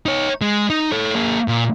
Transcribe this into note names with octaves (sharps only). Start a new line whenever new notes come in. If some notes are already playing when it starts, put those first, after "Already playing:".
D#4 C#5
G#3
D#4
A4 C#5
A#3 G#4
A#2